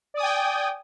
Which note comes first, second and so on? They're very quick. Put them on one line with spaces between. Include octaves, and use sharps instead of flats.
D5 D#6 G#5 G5